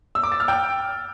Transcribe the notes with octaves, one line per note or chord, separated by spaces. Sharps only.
E6
D6
A6
F6
G5